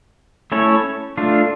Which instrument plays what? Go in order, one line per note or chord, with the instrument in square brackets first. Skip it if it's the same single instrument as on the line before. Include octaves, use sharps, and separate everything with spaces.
[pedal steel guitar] A3 C#4 E4 A4 C#5
A3 D4 F4